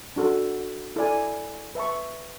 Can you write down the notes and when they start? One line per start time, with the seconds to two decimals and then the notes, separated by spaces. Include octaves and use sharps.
0.16 D4 F#4 A4
0.96 E4 A4 D5 G#5
1.75 B4 E5 A5 C#6